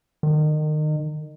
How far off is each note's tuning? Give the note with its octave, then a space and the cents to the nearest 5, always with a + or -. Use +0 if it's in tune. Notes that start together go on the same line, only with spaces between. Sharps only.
D#3 -30